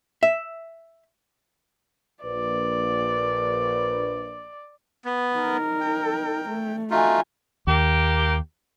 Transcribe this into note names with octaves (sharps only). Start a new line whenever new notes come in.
E5
A#1 B4 D5
B3
D#4 A#4
G5
A3
A3 D#4 F4 F#4 G#5
D#2 A#3 G4